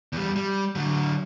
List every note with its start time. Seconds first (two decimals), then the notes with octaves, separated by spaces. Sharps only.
0.13 E2 G3
0.36 G3
0.76 D3 F#3